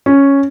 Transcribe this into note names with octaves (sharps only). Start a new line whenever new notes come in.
C#4